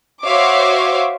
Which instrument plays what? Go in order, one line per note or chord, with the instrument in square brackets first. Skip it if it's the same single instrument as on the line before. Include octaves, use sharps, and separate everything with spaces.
[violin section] F#4 C5 C#5 E5 F5 D6